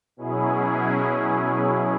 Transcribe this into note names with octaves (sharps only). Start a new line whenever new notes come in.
B2 F#3 C#4 E4 G#4